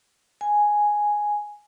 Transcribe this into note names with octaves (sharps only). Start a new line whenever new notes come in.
G#5